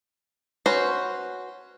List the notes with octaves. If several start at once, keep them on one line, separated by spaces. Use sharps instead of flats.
C#4 F#4 B4 C5